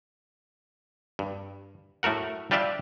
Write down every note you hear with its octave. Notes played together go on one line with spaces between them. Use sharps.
G2
A2 A3 F#4 A#4 F#5
G3 D4 F4 G4 D5 E5